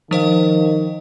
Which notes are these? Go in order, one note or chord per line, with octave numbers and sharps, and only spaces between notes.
D#3 F3 C5 F5